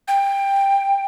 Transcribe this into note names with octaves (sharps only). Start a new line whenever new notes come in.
G5